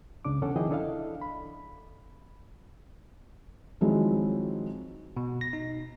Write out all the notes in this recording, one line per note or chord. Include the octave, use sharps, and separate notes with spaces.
C#2 C#3 D4 D6
E2 C3 C#4 A4 F#5
D#3 F3 E4 G#4 D#5 G5
D4 E4 A4 D#5 F5
B5
D#3 F3 F#3 G#3 C4 E4
B2
A#6
D#4